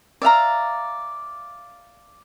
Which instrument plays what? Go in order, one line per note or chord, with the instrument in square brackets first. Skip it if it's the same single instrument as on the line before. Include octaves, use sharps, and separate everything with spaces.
[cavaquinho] D5 E5 F5 A#5